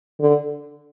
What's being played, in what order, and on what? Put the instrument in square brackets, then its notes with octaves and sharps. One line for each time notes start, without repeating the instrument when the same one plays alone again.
[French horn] D3